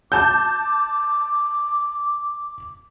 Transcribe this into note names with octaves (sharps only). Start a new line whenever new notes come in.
A5 D6 G6